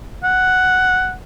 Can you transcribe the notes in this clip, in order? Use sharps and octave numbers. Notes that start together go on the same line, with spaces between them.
F#5